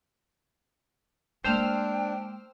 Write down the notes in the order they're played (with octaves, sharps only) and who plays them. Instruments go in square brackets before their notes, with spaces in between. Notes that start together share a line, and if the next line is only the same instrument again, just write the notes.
[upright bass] G#3 A#3 [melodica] D4 [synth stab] C5 E6 F6 [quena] G5